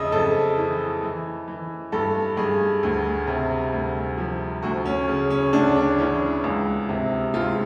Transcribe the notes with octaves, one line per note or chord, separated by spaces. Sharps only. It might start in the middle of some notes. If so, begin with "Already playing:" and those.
Already playing: F2 C#3 D#5 E5
F2 A4
E3
E3
E3
G2 A4
G2 G#4
D2
C3
D2
F3
D2 F#4
C#4
C#3
C#4
D2 D4
D4
E3 C#4
C#2
C3
C#2 F4